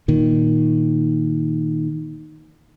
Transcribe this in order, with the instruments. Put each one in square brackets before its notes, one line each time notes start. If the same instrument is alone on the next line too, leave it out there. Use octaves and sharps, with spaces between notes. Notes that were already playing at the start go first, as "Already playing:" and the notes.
[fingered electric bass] A#2 D#3